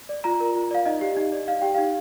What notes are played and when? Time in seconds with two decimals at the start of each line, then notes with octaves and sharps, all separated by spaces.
0.09 D5
0.24 F4 A#5
0.40 A#4
0.55 F4
0.71 D5 F5
0.85 D#4 D#5
1.01 G4
1.17 D#4
1.32 D5
1.48 D#4 F5
1.61 G4 G5
1.75 D#4 F5